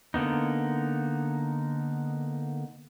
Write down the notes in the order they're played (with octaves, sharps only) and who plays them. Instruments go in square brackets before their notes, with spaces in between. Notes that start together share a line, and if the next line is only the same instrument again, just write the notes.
[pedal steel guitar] D3 A#3 B3 D#4